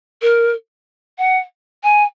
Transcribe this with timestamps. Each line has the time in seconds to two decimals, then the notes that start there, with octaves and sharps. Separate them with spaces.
0.22 A#4
1.18 F#5
1.83 G#5